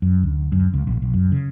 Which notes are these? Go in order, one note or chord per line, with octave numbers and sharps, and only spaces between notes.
F#2
D2
F#2
C#2
A#1
B1
F#2
C#3